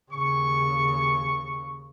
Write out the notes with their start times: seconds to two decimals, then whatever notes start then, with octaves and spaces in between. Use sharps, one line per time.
0.12 D#2 C#3 C#6